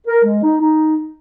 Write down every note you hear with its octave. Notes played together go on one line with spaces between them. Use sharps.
A#4
G#3
D#4
D#4